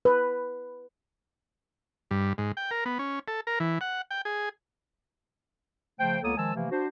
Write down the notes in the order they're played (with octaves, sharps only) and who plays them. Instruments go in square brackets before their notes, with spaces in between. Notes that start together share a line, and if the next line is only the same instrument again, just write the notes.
[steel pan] B4
[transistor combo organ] G2
G#2
G5
A#4
B3
C#4
A4
A#4
E3
F#5
G5
G#4
[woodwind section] C#3 F3 A3 C5 G5
C#2 A#3 B3 A4 C#5 D#6
D#3 F3 G#3 G#5 A5 E6
C3 E3 F3 A3 A#3
D4 F#4 C5